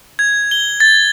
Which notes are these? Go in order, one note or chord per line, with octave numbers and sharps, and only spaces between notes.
G#6
G7
A6